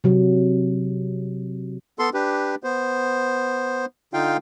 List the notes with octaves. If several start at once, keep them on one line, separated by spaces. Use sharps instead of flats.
C3 F#3
B3 A4 C6
D4 G4 B4
B3 C5
D3 D#4 F4 F5 G5